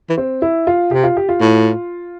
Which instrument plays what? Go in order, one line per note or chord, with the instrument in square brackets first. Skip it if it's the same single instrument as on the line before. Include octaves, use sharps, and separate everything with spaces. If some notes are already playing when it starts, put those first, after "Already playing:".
[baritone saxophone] E3
[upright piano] C4
E4
F4
[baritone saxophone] C3 [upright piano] G4
[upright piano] F4
G4
F4
[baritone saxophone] A2